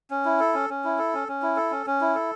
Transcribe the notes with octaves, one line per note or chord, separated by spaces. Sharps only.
C#4
E4
A4
C#4
C#4
E4
A4
C#4
C#4
E4
A4
C#4
C#4
E4
A4